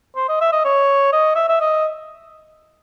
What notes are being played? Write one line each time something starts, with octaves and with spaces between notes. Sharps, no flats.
C5
D#5
E5
D#5
C#5
D#5
E5
E5
D#5